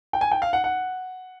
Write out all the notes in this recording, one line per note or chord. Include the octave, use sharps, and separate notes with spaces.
G5
G#5
G5
F5
F#5
F#5